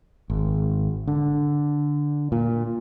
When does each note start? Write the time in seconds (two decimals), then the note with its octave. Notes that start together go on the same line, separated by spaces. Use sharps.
0.30 G#1
1.08 D3
2.32 A#2